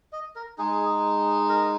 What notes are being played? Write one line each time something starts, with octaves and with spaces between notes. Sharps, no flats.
D#5
A#4
G#3 D#4 G#4
A#4